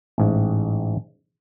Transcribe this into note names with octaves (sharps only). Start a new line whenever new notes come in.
A1 G#2